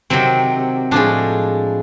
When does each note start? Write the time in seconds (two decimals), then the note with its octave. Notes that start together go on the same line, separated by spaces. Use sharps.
0.10 C3 D#3 F#3 C4
0.91 A2 F3 G#3 D4